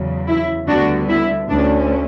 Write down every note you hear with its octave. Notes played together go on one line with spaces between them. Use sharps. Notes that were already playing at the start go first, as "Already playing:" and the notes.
Already playing: E2 C#3 F#3
E4
D2 D3 G3 B3 D4 F#4
E4
D2 D3 A3 C#4 D4